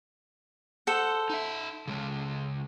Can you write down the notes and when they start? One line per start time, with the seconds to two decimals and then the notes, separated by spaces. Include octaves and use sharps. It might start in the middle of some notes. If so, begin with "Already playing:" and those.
0.87 A4 C5 F#5
1.30 D#4 E5
1.87 C#3 G#3